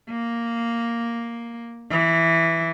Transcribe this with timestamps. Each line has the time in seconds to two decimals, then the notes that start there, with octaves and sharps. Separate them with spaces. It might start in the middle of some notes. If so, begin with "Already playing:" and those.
0.11 A#3
1.91 E3